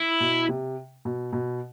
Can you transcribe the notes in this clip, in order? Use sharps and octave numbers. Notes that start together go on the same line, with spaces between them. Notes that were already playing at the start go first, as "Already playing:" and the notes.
Already playing: E4
B2
C3
B2
B2